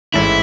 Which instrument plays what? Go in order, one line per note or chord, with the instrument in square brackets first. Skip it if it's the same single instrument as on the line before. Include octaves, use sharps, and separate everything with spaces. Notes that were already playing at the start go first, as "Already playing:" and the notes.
[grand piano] A1 G#2 E3 A3 [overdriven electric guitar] E4